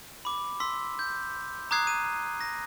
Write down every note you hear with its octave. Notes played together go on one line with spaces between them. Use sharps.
B5 D6
C6 E6 B6
G6
A#5 D6 D#6 F#6 G#6 C7
D#7
A#6